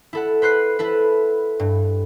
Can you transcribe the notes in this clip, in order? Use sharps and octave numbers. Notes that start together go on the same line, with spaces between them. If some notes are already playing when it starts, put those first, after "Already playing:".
E4 A4 F#5
B4 C5 F#6 C7
E4 A4 B4
G2